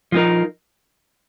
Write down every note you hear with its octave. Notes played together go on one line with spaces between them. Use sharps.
F3 G#3 D#4 A#4